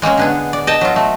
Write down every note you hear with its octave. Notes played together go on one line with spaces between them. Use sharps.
G#3 A#3 C4 C#4
D3 B3 G#4
D5
D#5 G5 A5
F#3 F4
A3